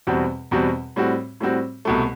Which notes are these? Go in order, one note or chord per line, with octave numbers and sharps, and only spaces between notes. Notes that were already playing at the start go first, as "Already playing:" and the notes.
E2 B2 G3 C4 F#4
E2 B2 G3 C4 F#4
A2 G3 C4 F#4
A2 G3 C4 F#4
C2 B2 A3